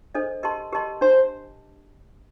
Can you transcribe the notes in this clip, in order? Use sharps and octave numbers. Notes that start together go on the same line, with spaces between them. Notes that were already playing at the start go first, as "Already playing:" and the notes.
D4 A4 C5 D#5
G4 A#4 D#5 A5 C6
G4 A#4 D#5 A5 C6
D4 C5